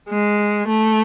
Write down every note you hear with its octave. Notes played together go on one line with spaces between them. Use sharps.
G#3
A3